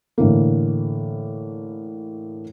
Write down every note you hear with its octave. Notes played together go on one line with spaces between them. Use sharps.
A2 D3 E3 A#3